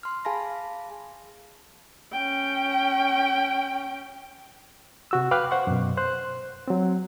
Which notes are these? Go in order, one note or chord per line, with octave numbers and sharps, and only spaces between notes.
C6 F6
G#4 F5 G#5 A5 B5 A#6
C#4 G5
C3 F#4 E6
B4 F5 G5 D6 F6 F#6
C5 F#5 C6 C#6
F#2 B2
C5 F#6
F#3 C4